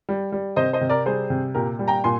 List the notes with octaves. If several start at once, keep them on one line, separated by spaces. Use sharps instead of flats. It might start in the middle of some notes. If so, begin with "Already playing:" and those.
G3
G3
C3 C5 D#5
C5 D#5
C3
A#4 D5
G3 G#4 C5
C3
A#2 G4 A#4
G3
G5 A#5
A#2 G#5 C6